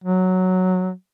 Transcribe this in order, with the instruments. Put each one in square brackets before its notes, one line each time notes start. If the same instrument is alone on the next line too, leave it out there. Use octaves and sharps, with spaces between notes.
[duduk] F#3